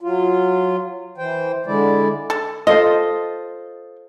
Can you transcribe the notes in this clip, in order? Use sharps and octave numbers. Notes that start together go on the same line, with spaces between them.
F#3 F4
E3 C5 G5
D3 G#3 E4 D5
A4
F4 A4 C5 D#5